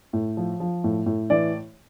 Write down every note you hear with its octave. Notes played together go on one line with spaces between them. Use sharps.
A2
F3
F3
A2
A2
E3 D5